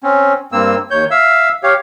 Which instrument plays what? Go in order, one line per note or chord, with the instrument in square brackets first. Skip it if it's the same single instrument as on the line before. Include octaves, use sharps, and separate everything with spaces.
[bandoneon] C4 C#4
G2 A#3 C4 E6
D#2 C#5 G6
E5 F5 E6
G4 C#5 F5